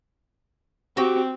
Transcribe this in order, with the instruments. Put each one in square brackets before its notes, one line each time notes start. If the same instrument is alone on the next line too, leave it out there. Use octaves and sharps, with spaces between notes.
[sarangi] C4 [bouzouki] F#4 G4 G5